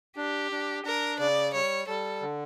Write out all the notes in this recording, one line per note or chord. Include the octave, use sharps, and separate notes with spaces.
D4 G4
D4
D4 A#4
C#3 D5
G3 C#5
G3 A4
D3